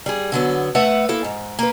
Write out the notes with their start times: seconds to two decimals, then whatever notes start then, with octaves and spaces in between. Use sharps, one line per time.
0.06 G3 G#4
0.32 D3 F#3 B3
0.75 A3 B4 E5 F#5
1.09 A#3 E4 A4
1.24 G#2
1.59 A#3 B4